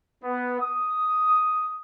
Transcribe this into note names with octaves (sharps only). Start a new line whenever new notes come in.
B3
D#6